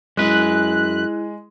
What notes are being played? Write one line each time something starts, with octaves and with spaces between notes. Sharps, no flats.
F#2 G#3 E4 G#4 B4 F#6